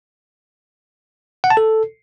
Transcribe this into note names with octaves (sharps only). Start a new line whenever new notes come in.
F#5
A5
A4